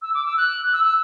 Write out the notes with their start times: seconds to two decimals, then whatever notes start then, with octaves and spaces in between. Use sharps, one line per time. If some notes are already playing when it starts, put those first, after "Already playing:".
0.02 E6
0.14 D6
0.26 E6
0.38 F#6
0.73 E6
0.85 E6